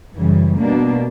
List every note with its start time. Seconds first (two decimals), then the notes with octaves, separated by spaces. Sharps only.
0.16 F#2 C#3 E3 G3
0.58 B2 G3 A#3 D4